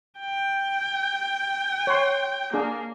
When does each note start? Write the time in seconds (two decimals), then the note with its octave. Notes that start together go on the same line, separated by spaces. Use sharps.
0.19 G5
1.87 C#5 C6
2.54 A#3 D4 G#4